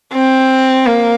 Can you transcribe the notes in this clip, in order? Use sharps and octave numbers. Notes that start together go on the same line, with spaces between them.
C4
A#3